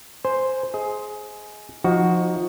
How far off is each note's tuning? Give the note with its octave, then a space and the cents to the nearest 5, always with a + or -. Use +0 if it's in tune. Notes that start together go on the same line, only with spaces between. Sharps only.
C5 +0 G#5 +0
G#4 +15 D#5 +30
F3 +15 D#4 +0 F#4 +0